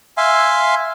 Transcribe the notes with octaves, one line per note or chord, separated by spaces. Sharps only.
E5 F5 G#5 C6